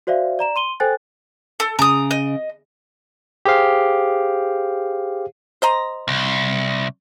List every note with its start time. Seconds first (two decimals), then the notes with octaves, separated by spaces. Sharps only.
0.07 F#4 C5 D5 E5 F5
0.39 D5 A#5 E7
0.56 C6 D#7 G7
0.80 A4 C5 G5 G#5 F#6 A6
1.60 A4
1.79 C#3 A#5 D#6
2.11 D#5
3.45 G4 G#4 C5 F5
5.62 C5 D#5 A#5
6.08 C2